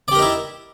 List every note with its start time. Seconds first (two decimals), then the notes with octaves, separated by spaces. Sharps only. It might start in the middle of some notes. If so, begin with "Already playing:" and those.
0.08 D5
0.11 G4
0.15 A#4
0.18 D#4
0.22 E4